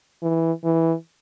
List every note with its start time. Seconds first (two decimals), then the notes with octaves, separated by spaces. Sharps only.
0.22 E3
0.64 E3